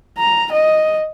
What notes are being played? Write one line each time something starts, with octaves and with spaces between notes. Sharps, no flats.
A#5
D#5